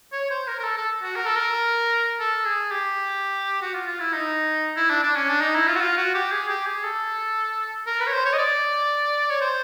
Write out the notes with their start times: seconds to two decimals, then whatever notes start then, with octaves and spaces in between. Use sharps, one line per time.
0.12 C#5
0.30 C5
0.47 A#4
0.60 A#4
0.64 A4
0.77 A4
1.02 F#4
1.16 A#4
1.26 A4
1.36 A#4
2.19 A4
2.45 G#4
2.71 G4
3.62 F#4
3.74 F4
3.87 F4
4.00 E4
4.13 D#4
4.77 E4
4.90 D4
5.03 D4
5.16 C#4
5.29 D4
5.41 D#4
5.55 E4
5.67 F4
5.76 F#4
5.80 F4
5.97 F#4
6.14 G4
6.32 G#4
6.48 G4
6.66 G#4
6.83 A4
7.87 A#4
8.00 B4
8.07 C#5
8.13 C5
8.25 C#5
8.33 D#5
8.38 D5
9.30 C#5
9.41 C5